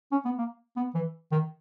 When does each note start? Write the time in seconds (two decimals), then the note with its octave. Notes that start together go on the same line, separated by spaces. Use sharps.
0.12 C#4
0.25 B3
0.38 A#3
0.77 B3
0.95 E3
1.32 D#3